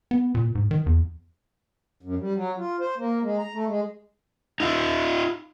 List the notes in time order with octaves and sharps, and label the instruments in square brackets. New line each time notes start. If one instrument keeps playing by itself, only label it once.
[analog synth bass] B3
A#2
G#2
D#3
E2
[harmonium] F#2
G3
F#3
F4
C5
A#3
G#3
A#5
A3
G#3
[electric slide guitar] D#4 F4